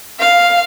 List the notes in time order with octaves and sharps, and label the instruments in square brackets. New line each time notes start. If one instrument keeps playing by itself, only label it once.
[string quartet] F5